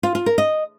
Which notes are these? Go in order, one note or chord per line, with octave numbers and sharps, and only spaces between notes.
F4
F4
A#4
D#5